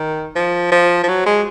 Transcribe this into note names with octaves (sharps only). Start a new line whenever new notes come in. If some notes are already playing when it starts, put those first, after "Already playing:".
Already playing: D#3
F3
F3
F3
F#3
G#3